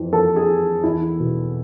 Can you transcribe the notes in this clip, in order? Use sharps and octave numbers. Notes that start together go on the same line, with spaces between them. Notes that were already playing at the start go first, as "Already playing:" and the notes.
Already playing: F2 E3
F2 A4
G#4
E3
E2 E4
B2